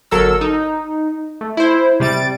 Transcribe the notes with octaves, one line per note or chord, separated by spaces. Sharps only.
G1 F#3 A4 A#4 E6
D#4
A3
E4 C5
C3 G3 A6 D7